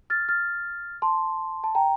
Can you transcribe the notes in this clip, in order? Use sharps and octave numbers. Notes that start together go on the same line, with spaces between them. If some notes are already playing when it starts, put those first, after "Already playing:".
F6 A6
F6 A6
A5 C6
A5
G5 A#5